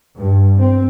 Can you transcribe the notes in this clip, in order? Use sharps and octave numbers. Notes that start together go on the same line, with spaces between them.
G2
C4